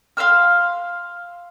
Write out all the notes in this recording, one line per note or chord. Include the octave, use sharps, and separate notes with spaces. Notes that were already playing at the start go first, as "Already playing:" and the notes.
F5 C6 E6 F6